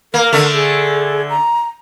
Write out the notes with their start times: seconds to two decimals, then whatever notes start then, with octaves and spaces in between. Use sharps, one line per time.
0.14 A#3 A#4
0.33 D3 A3
0.54 G#4
1.29 A#5